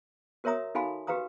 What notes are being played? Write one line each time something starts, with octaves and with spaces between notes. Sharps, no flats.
F#4 A#4 C#5 E5 A#5 D#6
D#4 F#4 A4 F5 G#5 B5
F#4 G4 B4 F5 A#5 D#6